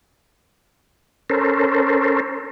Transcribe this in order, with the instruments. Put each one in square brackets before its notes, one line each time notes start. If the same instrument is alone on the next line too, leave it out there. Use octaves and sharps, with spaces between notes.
[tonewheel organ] C#4 A4 A#4 C5